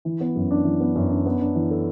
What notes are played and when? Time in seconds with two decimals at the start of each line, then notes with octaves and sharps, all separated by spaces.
0.05 E3
0.20 B3
0.36 F#2
0.51 D4
0.65 E3
0.80 B3
0.95 F#2
1.10 D4
1.26 B3
1.41 D4
1.55 E3
1.70 A4